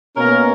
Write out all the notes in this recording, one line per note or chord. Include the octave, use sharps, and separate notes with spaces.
B2 A#3 C#4 A#4